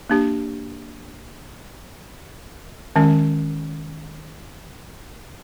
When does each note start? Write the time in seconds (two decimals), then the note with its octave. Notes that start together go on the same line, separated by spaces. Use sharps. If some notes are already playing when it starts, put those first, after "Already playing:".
0.10 A#3 D4 G4
2.96 D#3 G#3 C#4